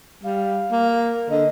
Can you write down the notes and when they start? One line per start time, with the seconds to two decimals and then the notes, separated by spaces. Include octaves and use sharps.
0.23 G3 F5
0.71 A#3
0.92 A#4
1.30 D3 D#5